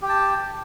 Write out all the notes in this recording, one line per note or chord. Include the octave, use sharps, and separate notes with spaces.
G4 G5 A5